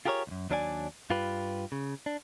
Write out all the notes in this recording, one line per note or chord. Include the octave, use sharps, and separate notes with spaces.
F4 G4 G#4 A#4 C5 C#5
C2 F#2
D#2 F#3 D4 A#4 D5 G#5
G2 F4 G4 B4
C#3
D4